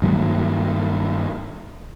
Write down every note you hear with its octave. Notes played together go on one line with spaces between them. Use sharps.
G2 D#3 F#3 A#3